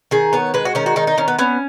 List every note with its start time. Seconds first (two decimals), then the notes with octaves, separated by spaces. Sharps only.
0.11 D#3 G#4
0.33 B3 C#5
0.54 G#3 B4
0.65 F#4
0.75 D#3 C#4
0.86 F#4
0.96 D#3 D#4
1.07 D#4
1.18 D#3 C#4
1.28 B3
1.39 B3 C#4